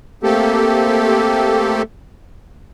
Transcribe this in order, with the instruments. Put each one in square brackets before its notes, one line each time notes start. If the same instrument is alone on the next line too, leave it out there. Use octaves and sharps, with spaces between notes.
[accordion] A3 A#3 C4 G4 A4